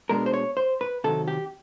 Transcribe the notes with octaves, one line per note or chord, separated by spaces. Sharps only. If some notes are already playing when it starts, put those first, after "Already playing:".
B2 G#3 B3 D4 A#4
C5
C#5
C5
B4
C3 D#3 F#3 A4
G4